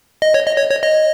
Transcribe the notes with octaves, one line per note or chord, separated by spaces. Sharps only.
D#5
C#5
D#5
C#5
C#5
D#5